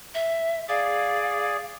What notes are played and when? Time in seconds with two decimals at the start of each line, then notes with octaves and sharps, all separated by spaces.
0.15 E5
0.69 G#4 D5 F5